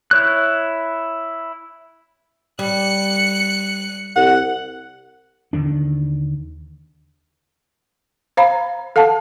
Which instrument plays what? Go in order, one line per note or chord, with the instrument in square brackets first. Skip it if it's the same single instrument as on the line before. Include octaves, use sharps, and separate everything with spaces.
[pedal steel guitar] E4 C#5 F#6
[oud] G3 [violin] F#6 C#7
[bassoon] C2 [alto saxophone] F#5
[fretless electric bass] D#2 D3 D#3 D4
[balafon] C5 F5 A#5 B5
A4 F5 F#5 A5